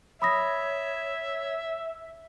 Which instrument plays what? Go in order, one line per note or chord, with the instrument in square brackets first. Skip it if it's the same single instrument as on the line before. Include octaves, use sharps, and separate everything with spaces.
[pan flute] C#5 [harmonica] E5 [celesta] B5 D#6 A#6